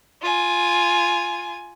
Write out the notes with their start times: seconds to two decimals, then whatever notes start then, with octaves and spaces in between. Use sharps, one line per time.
0.22 F4 G#5